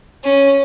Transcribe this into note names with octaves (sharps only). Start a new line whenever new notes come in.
C#4